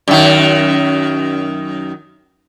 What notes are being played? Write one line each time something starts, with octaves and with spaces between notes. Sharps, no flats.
F#2 D#3